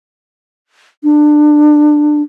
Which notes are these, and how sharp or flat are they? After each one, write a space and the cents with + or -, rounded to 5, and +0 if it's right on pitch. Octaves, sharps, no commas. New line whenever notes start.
D4 +20